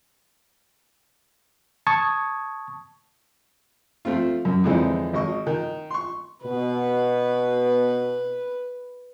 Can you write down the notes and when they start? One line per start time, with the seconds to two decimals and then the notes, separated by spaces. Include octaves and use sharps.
1.87 A5 C#6 D#6 G#6
4.05 F3 A3 C4 F4
4.45 F#2
4.64 F2 D3 E3 G#3 C4 D#4
5.13 G#1 D#5 C#6
5.47 D#3
5.91 C6 C#6
6.44 B2 B4